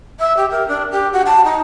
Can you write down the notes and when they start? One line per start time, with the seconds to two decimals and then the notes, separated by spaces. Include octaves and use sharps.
0.20 E5
0.37 G4
0.51 A#4
0.68 D4
0.92 G4
1.13 F#4
1.26 A5
1.45 D#4